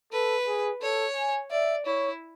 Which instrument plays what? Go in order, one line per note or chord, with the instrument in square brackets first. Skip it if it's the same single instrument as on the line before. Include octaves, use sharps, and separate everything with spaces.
[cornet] A4 [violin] B4
[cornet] G#4
[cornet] A4 [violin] C#5
[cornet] G#5
[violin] D5 [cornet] E5
[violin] E4 [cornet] C#5